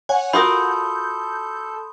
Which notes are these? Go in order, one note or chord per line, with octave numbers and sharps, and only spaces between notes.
C#5 F#5 G#5
F4 F#4 A4 A#4 B5 C6 D#6 G6